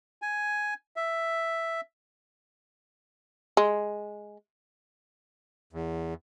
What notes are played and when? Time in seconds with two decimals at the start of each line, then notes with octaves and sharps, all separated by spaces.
0.22 G#5
0.96 E5
3.57 G#3
5.73 E2